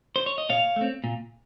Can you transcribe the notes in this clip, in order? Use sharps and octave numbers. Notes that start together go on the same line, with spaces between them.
C5
C#5
D#5
A#2 C#5 F5
A3 C4
A#2